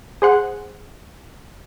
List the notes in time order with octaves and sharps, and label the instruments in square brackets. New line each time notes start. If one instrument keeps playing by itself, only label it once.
[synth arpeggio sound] G#4 C5 F#5